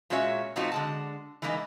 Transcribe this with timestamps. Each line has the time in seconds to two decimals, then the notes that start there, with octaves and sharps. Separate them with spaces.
0.10 A#2 G#3 C#4 F#4 C#5 E5
0.56 A#2 F3 A3 C4 D#4 F#4
0.72 D3 G#3 A5
1.42 E3 G3 G#3 A#3 D#4 E4